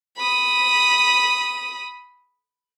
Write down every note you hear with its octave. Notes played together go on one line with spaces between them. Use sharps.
B5 D#6